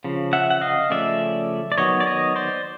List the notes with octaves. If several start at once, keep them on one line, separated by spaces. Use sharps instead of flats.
C#3 F3
E5 F#5
F#5
D#5 F5
C#3 F3 A3 C#4 D5 E5
D5
D#3 F#3 B3 C#5 D#5
D5
C#5 D#5
C5 D5